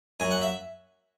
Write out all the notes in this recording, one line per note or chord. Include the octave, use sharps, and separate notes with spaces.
F#2 G#5
F#5
E5